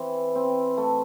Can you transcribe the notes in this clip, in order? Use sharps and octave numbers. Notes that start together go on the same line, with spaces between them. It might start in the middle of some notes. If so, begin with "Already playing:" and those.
Already playing: E3 C4
C4
A3